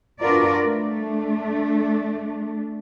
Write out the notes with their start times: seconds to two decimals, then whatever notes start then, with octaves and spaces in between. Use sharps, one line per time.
0.21 D4 F4 F#4 A#4 B4 D5
0.64 A3 D4